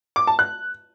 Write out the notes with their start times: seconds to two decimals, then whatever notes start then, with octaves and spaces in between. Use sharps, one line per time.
0.16 D6
0.27 A5
0.39 F#6